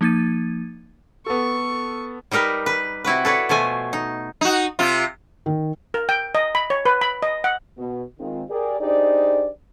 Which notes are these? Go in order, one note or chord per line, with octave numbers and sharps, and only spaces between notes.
F3 A#3 D#4 G#6 A6 D#7
B3 A4 C#6
G3 D#4 G4 A#4 B4
B4
C3 E4 F#4 B4
A4 B4 C#5 D5
B2 F3 A3 G#5
D#4
D#4 F#4
C3 F4
D#3
A#4
G5
D#5
B5
C#5
B4
B5
D#5
F#5
B2
D#3 G#3 C4 F4
G4 G#4 A#4 D5
D4 D#4 G4 G#4 C5 D5